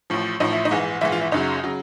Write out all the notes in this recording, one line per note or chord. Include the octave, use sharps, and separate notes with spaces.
A1 A2 F3
A1 A2 F3 D#4
E4
D#4
A#1 G#2 E3
A#1 G#2 E3 E4
F4
E4
F#1 F#2 C#3 F#3 D#4
C#3 F#3